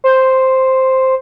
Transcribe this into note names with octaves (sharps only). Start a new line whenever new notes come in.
C5